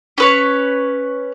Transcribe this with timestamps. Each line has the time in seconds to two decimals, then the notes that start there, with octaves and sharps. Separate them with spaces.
0.18 C#4 B4 C#5